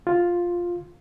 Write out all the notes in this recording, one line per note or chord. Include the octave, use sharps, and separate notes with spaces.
F4